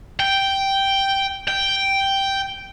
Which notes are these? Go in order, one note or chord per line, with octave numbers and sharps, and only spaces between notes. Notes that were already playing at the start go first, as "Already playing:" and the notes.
G5
G5